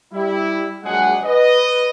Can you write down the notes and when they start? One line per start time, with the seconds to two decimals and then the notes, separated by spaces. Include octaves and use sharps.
0.13 G3 E4
0.83 A#1 F#3 G#3 D4 G#4 F#5
1.24 B4 D#5